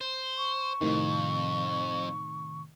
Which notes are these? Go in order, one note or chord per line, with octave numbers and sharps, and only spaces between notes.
C5
C#6
F2 A2 C3 D#3